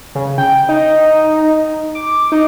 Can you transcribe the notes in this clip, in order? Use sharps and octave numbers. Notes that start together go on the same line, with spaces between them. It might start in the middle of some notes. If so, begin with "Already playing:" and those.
C#3
G5
D#4
D6
D#4